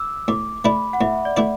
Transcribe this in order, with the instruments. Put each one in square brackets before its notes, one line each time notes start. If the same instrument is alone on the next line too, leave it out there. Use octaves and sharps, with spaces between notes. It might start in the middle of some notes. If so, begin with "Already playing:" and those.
Already playing: [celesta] D6 E6
[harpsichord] A2 [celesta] D6
[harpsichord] A3 E4 D5 [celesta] B5
[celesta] F#5
[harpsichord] A2 [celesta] E5
[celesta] D5
[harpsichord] A3 E4 D5